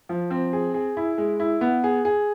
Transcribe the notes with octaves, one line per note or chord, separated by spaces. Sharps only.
F3
C4
G#4
G#4
E4
G#3
E4
B3
G#4
G#4